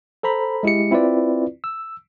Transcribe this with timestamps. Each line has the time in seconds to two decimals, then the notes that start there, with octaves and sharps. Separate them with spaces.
0.23 A4 C5 A#5 B5
0.63 G#3 E4 G4 C#7
0.91 C4 E4 F4 B4 D5
1.64 E6